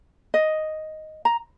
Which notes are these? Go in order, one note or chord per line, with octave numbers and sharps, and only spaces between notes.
D#5
A#5